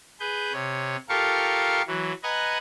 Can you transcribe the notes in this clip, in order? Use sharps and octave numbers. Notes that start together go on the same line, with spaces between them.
G#4 B4 G6
C3 C#5
F4 G4 A4 A#4 F5 C#6
E3 F#3
B4 D#5 F#5 G#5 A#5